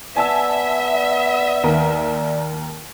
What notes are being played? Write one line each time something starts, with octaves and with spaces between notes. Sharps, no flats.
B3 D5 E5 G#5 A5 E6
D#2 A#4